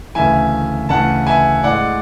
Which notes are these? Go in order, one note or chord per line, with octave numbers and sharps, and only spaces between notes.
D2 C#3 E3 E5 G#5
D2 C#3 E3 F#5 A5
E5 G#5
A2 G#3 D5 F#5